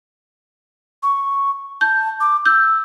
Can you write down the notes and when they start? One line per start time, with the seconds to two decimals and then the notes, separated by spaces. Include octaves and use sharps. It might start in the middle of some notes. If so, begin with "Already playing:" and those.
1.03 C#6
1.81 A5 G6
2.20 D6
2.46 E6 G6